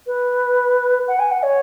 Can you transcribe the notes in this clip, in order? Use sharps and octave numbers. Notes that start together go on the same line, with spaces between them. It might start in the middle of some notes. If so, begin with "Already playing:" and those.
B4
F#5
G#5
F#5
C#5